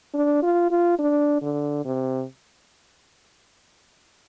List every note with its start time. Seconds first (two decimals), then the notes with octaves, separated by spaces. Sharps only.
0.14 D4
0.43 F4
0.71 F4
0.99 D4
1.42 D3
1.85 C3